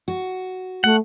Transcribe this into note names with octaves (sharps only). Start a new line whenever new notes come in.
F#4
A3 F#5